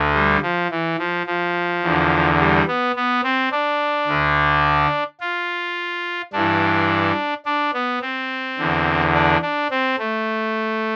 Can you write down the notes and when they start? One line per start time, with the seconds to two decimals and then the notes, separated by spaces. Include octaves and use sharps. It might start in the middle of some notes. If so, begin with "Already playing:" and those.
Already playing: D2 D3
0.14 G3
0.42 F3
0.71 E3
0.99 F3
1.27 F3
1.83 E2 D3
2.39 G3
2.67 B3
2.95 B3
3.24 C4
3.52 D4
4.08 D2 D3
5.20 F4
6.33 G2 E3 D4
7.46 D4
7.73 B3
8.02 C4
8.58 E2 D3
9.14 D4
9.42 D4
9.70 C4
9.99 A3